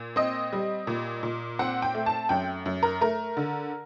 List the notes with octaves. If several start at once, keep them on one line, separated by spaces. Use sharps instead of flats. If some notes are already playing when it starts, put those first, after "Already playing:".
Already playing: A#2
C4 D#5
G3
A#2
A#2
C4 F#5
G5
A3
A5
F#2 G5
F#2
A#4
A3 A#4
D3